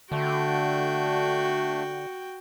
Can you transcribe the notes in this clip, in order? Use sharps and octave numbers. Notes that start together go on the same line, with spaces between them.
D3 A3 D4 F#4 G5